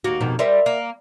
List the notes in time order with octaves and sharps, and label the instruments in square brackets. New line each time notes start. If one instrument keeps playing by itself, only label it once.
[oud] D#2 F#4 [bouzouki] A#3
[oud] F2 B2 D#3
[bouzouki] G3 [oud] A#4 C5 E5
[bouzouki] A#3